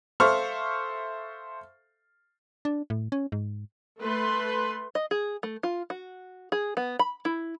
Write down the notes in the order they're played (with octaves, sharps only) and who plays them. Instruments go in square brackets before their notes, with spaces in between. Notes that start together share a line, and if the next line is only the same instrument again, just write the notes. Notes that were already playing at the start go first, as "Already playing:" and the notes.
[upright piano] A4 C5 E5 F5 C#6 F6
[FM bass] D4
A2
C#4
G#2
[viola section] A3 B4 C6
[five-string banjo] D#5
G#4
A3
F4
F#4
G#4
B3
B5
E4